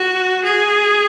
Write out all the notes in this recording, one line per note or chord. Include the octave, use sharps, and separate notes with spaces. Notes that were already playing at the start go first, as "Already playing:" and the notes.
Already playing: F#4
G#4